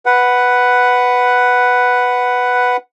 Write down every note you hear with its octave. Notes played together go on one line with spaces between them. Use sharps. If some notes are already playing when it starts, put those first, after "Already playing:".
B4 F#5